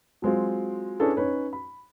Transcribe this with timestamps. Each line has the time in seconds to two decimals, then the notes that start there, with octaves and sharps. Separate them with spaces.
0.22 F#3 G#3 C4 F4
1.00 C#4 D4 E4 G#4 A4 B4
1.16 C#4 D#4 B4 C#5
1.53 B5